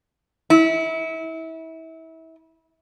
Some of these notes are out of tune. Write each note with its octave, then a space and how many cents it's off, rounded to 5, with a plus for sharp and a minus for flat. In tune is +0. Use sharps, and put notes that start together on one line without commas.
E4 -30